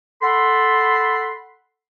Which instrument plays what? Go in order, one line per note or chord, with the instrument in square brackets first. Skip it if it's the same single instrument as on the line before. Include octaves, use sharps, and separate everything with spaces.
[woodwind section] A4 F#5 B5 C6